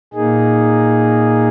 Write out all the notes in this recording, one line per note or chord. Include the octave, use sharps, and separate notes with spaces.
A#2 A#3 D#4 G#4